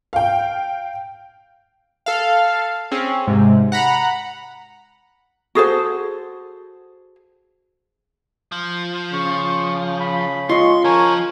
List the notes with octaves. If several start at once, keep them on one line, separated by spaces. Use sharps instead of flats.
F5 G5
A4 F5
C4 C#4 G#4
G#2 C3
F#5 A#5 B5
F#4 G#4 A4 C5
F3
C#3 C#6
B5
G#3 F4 D#5 C6 C#6
F3 A#4 C#5 G#5